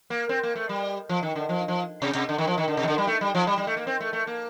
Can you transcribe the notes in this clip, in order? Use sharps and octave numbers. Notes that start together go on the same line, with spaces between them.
A#3
C4
A#3
A3
G3
F3
D#3
D3
F3
F3
C3
C3
D3
D#3
F3
D#3
D3
C3
D#3
D3
G3
A3
G3
F3
G3
G3
A3
A#3
C4
A3
A3
A#3